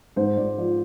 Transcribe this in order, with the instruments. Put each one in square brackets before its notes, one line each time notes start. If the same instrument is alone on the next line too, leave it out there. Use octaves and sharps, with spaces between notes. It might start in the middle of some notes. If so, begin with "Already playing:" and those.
[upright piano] G#2 C5
G#2 D5
F3 D5